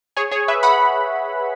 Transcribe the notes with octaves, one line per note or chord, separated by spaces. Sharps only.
G#4 C#5
G#4 C#5
B4 E5
F#5 B5